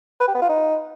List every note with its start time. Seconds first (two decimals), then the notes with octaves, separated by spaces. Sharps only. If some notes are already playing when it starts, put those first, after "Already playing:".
0.20 B4
0.28 G4
0.35 B3
0.42 F4
0.49 D#4